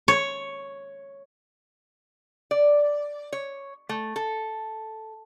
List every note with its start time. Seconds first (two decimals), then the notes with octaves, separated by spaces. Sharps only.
0.08 C#5
2.51 D5
3.33 C#5
3.89 A3
4.16 A4